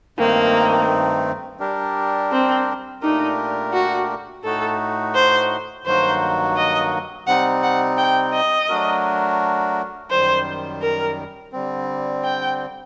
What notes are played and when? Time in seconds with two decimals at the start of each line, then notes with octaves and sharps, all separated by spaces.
0.18 G2 D#3 A3 A#3 C4 D#4
1.60 G3 D4 G4 A#4
2.32 C4
3.01 A#2 A3 D4 D#4 G4 A#4
3.73 F#4
4.44 A2 A3 D#4 F#4 A4
5.15 C5
5.85 G2 D#3 F#3 A#3 F#4 C5
6.57 D#5
7.27 C3 G3 C4 D#4 F#5
7.63 F#5
7.97 G5
8.33 D#5
8.69 F#3 A3 D4 F#4 A#4
10.10 F#2 D#3 G3 C5
10.82 A#4
11.53 D3 G3 C4
12.24 G5